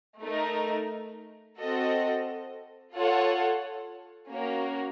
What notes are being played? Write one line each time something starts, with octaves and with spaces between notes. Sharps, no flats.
A3 D#4 A#4
C4 F#4 A4 D#5
F4 A4 C#5 F#5
A#3 C#4 F#4 A#4